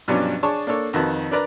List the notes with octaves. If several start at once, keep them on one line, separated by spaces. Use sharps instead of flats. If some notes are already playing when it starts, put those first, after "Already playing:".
G2 B2 F3 F#3 C#4 D4
D4 G#4 C#5 A5 C#6
A#3 D4 A4 C#5
F2 D#3 F#4 B4 A5
D4 A#4 B4 D5 A#5